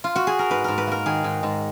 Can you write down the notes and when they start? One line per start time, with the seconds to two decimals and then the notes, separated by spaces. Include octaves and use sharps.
0.04 F4
0.16 F#4
0.27 G#4
0.39 A#4
0.50 G#2 B4
0.64 G#2 A#4
0.78 B4
0.87 A#3 A#4
1.06 D#3 G#4
1.24 G#2
1.43 G#2